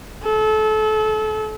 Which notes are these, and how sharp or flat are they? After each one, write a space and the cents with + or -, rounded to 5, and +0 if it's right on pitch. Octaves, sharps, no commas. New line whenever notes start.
A4 -30